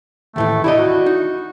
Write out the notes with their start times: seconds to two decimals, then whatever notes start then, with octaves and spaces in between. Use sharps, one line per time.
0.36 D#2 A2 E3 A3
0.64 C3 E4 D5 D#5
0.77 F#4
1.06 D#4